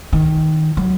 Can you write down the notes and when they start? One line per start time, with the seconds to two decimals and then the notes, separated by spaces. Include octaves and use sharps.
0.13 D#3
0.77 F#3